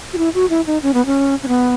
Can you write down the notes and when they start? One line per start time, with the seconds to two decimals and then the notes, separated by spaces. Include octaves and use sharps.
0.13 F#4
0.18 E4
0.34 F#4
0.50 E4
0.67 D#4
0.83 C#4
0.94 B3
1.06 C#4
1.43 C#4
1.48 B3